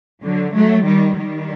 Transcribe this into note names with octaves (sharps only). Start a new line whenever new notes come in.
D3 F#3
F#3 A3
D#3 G3
D#3 G3